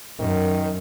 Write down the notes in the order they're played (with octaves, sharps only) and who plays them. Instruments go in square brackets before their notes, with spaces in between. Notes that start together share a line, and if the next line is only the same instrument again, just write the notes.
[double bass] F#2 [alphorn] D#3